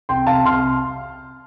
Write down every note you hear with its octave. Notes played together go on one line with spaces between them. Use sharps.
C2 G5 C6
C2 F5 A5
C2 C6 F6